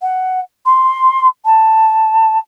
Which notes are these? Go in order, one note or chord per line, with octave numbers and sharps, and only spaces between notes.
F#5
C6
A5